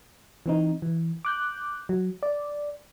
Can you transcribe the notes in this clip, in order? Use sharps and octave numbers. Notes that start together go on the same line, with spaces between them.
E3 C4 D#4
E3
D6 F#6 G6
F#3
D5